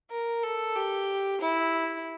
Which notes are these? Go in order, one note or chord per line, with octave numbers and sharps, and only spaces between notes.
A#4
A4
G4
E4